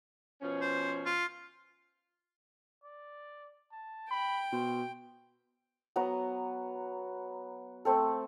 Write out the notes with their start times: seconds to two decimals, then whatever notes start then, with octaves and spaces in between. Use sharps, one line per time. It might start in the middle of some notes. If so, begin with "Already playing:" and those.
0.42 B2 F3 C#4
0.61 C5
1.06 F4
2.83 D5
3.71 A5
4.11 G5 B5
4.52 B2 C5
5.96 F#3 B3 A#5
7.85 A3 C4 A4